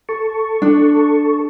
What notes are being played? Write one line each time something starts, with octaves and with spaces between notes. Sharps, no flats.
A4 A5 C#6
D4